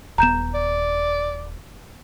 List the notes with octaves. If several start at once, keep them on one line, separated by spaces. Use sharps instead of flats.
D#1 B3 A#5 G6 E7
D5